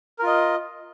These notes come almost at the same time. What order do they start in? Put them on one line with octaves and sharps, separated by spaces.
A#4 F4 D#5